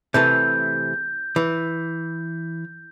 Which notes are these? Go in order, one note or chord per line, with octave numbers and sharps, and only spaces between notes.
C3 E3 A3 G6
E3